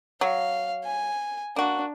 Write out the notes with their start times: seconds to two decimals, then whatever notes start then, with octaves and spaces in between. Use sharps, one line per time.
0.21 F#3 F5
0.85 G#5
1.56 A#3 D4 F#4